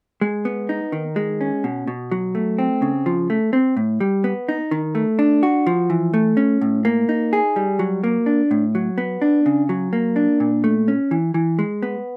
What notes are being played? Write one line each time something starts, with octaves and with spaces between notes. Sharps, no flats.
G#3
B3
D#4
D#3
G#3
C#4
B2
B2
F#3
A3
C4
C#3
F3
A3
C4
A2
G3
B3
D#4
D#3
A3
D4
F#4
F3
E3
A3
C#4
A2
A#3
D#4
G#4
G3
F#3
A#3
D4
A2
F#3
B3
D4
C#3
F#3
A#3
D4
A#2
A3
C#4
E3
E3
G#3
B3